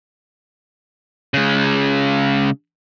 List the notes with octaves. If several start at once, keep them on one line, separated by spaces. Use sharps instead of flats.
C#3 G#3